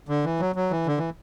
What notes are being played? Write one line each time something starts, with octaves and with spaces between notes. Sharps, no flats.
D3
E3
F#3
F#3
E3
D3
E3